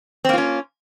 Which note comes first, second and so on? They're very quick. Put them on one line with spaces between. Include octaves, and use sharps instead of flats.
C4 A#3 F4 C#4